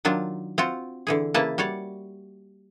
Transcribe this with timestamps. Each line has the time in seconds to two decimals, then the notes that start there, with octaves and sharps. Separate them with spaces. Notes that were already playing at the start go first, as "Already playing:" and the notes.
0.05 D#3 F#3 D4 F4
0.58 C4 F4 F#4
1.07 D3 E3 G#4
1.34 C#3 E3 A#3 E4 B4 A5
1.58 G3 F#4 C#5 D5